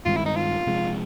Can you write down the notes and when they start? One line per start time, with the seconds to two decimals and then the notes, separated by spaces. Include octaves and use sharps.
0.05 G2 D#3 G#3 C4 F4
0.16 E4
0.26 D#4
0.36 F4
0.67 C3 F3 G#3